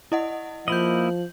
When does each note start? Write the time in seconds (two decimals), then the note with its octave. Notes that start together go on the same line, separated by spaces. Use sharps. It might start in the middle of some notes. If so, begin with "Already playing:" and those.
0.12 E4 D#5 F#5
0.68 F3 A#3 E4 D#5 G6 F#7